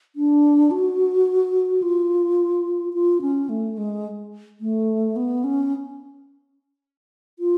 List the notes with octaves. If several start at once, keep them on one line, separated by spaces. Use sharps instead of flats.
D4
F#4
F4
F4
C#4
A3
G#3
A3
B3
C#4
F4